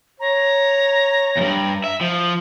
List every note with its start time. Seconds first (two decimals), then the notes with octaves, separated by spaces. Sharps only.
0.20 C#5 A#5
1.37 E2 G2
1.84 E5
2.01 F3